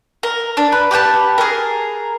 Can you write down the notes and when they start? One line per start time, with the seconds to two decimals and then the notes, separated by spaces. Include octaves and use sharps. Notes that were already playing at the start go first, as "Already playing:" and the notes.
0.23 A#4
0.57 D4
0.72 B4
0.91 G4 B4 G5 A5
1.38 G#4 A#4